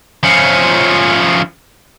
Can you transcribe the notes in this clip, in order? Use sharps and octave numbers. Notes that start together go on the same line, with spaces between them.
F3 C#4